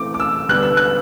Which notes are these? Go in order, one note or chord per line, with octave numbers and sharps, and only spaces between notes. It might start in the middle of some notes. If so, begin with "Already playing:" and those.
Already playing: E3 A3 C4 D6
D6
E6
D3 G3 B3 D4 F#6
E6
F#6